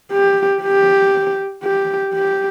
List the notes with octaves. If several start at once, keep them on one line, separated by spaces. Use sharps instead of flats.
G4
G4
G4
G4